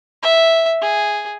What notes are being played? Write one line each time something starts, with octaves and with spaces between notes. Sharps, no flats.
E5
G#4